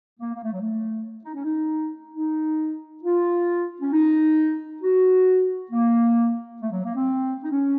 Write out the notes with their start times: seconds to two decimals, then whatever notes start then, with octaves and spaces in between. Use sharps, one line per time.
0.20 A#3
0.34 A#3
0.43 A3
0.52 F#3
0.61 A3
1.24 D#4
1.35 C#4
1.44 D#4
2.14 D#4
3.03 F4
3.81 C#4
3.92 D#4
4.82 F#4
5.71 A#3
6.62 A3
6.72 F#3
6.84 A#3
6.95 C4
7.43 D#4
7.51 C#4